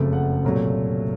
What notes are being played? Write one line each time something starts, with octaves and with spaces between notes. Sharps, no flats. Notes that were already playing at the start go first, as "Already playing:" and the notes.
Already playing: F#1 F2 C#3 A3
F#5
C2 A#2 F#3 A3